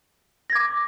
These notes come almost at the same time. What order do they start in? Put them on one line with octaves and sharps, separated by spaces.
A#6 G#6 D6